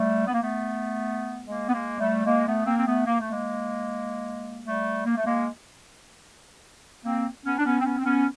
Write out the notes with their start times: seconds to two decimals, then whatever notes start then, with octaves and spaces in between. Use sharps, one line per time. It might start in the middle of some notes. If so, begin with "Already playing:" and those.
Already playing: G3 A3
0.27 B3
0.34 A#3
0.41 A3 B3
1.46 G#3 A#3
1.69 B3
1.73 G#3 A#3
2.00 G3 A3
2.26 G#3 A#3
2.47 A3 B3
2.66 A#3 C4
2.77 C4
2.86 A3 B3
3.06 A#3
3.20 A3
3.31 G#3 A#3
4.66 G3 A3
5.06 A#3
5.16 A3
5.26 G#3 A#3
7.05 A#3 C4
7.45 B3 C#4
7.58 D4
7.65 B3 C#4
7.80 C4
7.85 B3 C#4
7.98 C4
8.05 B3 C#4